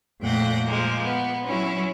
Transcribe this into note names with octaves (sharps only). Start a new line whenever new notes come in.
F2 A#2 A3 F#5 G5 A#6
A#2 F3 G#3 A#3
B3 B4
F#3 C#4 E4